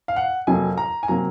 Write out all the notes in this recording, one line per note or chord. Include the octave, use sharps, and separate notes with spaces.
F5
F#5
F2 C3 F#3 A#3 G#5
A#5
G#5
C3 F#3 A#3 A#5